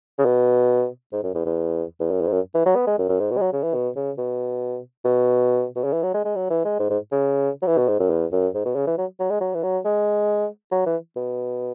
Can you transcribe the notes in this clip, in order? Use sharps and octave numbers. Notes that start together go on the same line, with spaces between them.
C#3
B2
G#2
F#2
E2
E2
E2
F#2
E2
G#2
F#2
E3
F#3
B3
G#3
F#2
F#2
G#2
B2
G#3
F#3
C#3
E3
B2
C#3
B2
B2
B2
C#3
E3
F#3
G#3
G#3
F#3
E3
G#3
G#2
G#2
C#3
F#3
E3
B2
G#2
F#2
E2
F#2
G#2
B2
C#3
E3
F#3
F#3
G#3
F#3
E3
F#3
G#3
F#3
E3
B2